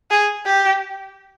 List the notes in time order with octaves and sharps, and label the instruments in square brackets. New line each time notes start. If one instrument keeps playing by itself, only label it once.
[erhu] G#4
G4